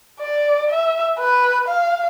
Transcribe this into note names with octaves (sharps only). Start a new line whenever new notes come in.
D5
E5
B4
F5